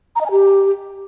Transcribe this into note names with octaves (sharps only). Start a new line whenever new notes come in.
A#5
D#5
G#5
G4